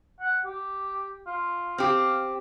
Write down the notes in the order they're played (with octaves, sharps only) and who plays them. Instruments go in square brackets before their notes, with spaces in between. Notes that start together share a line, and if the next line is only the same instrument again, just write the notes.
[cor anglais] F#5
G4
F4
[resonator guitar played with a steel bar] C4 G4 [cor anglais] F5